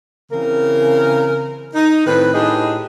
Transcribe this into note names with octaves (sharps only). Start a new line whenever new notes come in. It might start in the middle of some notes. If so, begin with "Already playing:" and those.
C#3 E3 C4 A#4
D#4
A2 D#3 C4 B4
A2 D4 D#4 G4 G#4 D#5